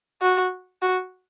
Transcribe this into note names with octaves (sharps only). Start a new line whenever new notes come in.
F#4
F#4